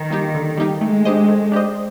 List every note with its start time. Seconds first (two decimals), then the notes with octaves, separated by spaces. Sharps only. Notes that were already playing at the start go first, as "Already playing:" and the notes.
Already playing: D#3
0.10 G3 A#3 D#4 G4
0.35 D3
0.57 G3 A#3 D#4 G4
0.81 G#3 A3
1.05 D4 G4 C5 D#5
1.28 A3
1.52 D4 G4 C5 D#5